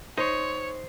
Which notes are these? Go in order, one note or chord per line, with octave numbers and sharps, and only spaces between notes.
D#4 C5 C#5